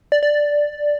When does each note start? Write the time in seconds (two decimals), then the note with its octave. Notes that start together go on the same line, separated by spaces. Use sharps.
0.12 D5
0.23 D5